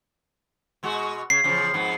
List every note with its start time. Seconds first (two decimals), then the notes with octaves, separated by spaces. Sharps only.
0.83 B2 G#3 F#4
1.30 C#3 C7
1.44 E2 C#3 F3
1.73 F2 G#2 B3